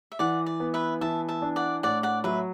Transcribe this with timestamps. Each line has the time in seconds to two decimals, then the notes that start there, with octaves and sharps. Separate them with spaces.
0.12 E5
0.19 E3 D5 F#5
0.46 D5
0.60 B3
0.74 B4 E5
1.01 E3 E5 A5
1.29 E5 A5
1.42 D4
1.56 D5 F#5
1.83 A2 D5 F#5
2.03 D5 F#5
2.24 F#3 B4 E5